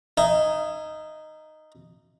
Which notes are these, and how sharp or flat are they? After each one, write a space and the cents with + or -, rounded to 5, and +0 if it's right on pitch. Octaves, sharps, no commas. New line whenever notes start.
D#4 -5 E5 +30 G#5 +0